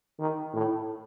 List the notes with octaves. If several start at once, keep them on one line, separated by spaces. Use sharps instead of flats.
D#3
A2